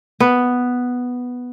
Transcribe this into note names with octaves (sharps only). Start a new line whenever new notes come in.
B3